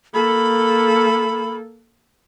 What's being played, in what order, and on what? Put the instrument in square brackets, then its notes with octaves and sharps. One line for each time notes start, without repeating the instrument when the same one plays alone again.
[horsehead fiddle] A#3 A4 [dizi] B5